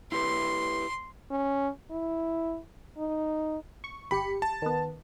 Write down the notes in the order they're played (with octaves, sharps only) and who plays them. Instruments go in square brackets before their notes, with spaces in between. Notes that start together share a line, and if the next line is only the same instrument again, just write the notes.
[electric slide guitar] E4 G4 B4 [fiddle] C6
[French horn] C#4
E4
D#4
[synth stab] C#6
[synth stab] G1 G4 C#7 [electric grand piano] B5
[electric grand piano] A5
[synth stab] D#3 B3